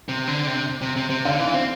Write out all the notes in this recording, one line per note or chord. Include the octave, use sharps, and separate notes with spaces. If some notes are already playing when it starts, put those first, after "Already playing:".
C3
D3
C3
C3
C3
C3
D3 F5
E3
C4